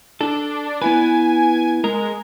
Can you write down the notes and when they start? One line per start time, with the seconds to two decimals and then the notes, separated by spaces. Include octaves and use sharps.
0.21 D4 A4
0.82 B3 E4 B4 G#5
1.84 G#3 A#4